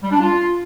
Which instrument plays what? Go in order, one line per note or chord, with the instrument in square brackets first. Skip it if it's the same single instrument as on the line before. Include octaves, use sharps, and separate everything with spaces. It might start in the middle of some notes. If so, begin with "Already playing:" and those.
[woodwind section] G3
D4
F4